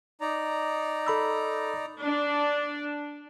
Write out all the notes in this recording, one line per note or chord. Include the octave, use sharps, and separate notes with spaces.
D#4 D5 A#5
A4 B5 E6
D4